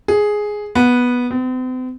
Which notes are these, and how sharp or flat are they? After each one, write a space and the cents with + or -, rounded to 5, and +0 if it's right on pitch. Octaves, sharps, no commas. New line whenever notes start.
G#4 +5
B3 -10
C4 -45